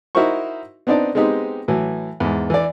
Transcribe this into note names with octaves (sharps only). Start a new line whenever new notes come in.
D#4 E4 F#4 A#4 C5 C#6
B3 C4 D4 D#4 D5
G#3 B3 C4 D#4 G4
A2 E3 F#3
E2 G#2
E3 D5